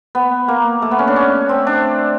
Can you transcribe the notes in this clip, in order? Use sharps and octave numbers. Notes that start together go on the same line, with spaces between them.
B3
A#3
A3
B3
C#4
D4
C#4
C4
D4